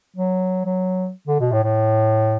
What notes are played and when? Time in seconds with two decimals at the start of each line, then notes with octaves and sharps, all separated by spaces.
0.16 F#3
0.66 F#3
1.27 D3
1.40 B2
1.52 A2
1.64 A2